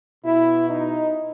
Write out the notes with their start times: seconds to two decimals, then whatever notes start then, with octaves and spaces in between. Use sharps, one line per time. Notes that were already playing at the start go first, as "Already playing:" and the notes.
0.25 B2 E4
0.71 D#4